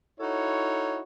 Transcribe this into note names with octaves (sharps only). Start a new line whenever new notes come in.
D#4 E4 F#4 A4 C#5